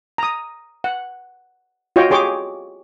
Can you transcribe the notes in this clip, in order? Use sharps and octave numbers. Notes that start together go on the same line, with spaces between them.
A#5 D#6
F#5
F4 F#4 C#5 D#5 G5
G4 G#4 C#5 C6 D6